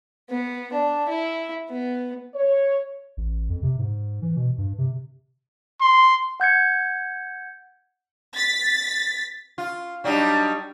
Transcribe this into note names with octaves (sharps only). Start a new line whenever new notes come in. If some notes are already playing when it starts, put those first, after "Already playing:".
B3
D4
E4
B3
C#5
A1
F2
C3
G#2
E3
B2
G2
C3
C6
F#5 G6 G#6 C#7
A6 B6
F4
F#3 G3 D4 D#4